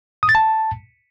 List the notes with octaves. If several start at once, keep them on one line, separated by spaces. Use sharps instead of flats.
D#6
A6
A5